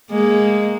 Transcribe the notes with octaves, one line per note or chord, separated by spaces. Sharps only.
G#3 A#3